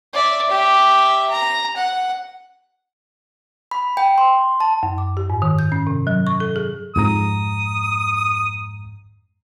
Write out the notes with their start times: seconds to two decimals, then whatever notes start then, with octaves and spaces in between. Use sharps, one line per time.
0.13 D5 E5
0.49 G4 E5
1.30 A#5
1.76 F#5
3.71 B5
3.97 G5
4.18 C6
4.60 A5
4.83 F#2
4.98 D6
5.17 G4
5.30 G#2
5.42 D#3
5.59 G6
5.72 C#4
5.87 C3
6.07 F#3
6.27 C#6
6.40 A4
6.56 G#4
6.96 F2 G#2 A#5 D#6